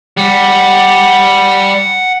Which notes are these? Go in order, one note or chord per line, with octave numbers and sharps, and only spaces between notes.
G3 F#5